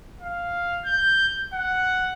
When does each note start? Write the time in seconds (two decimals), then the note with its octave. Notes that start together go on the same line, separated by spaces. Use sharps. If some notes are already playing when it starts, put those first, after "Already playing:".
0.21 F5
0.85 G6
1.53 F#5